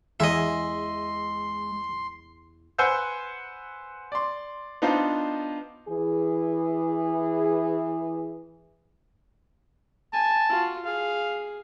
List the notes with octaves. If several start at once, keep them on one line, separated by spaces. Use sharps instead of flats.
E2 G#3 G#4 D#5 E5 C6
B4 C5 F#5 G#5 E6 G6
D5 C6
B3 D4 D#4 F4 C5
E3 G#4
G#5 A5
F4 F#4
G#4 F5